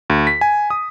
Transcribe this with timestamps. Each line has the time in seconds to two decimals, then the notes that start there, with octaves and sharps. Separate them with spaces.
0.10 D2
0.27 B6
0.41 G#5
0.70 D#6